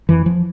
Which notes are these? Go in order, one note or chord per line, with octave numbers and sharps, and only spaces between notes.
F2 E3
F3